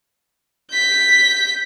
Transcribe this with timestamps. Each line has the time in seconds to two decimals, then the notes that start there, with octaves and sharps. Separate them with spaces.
0.71 G6 B6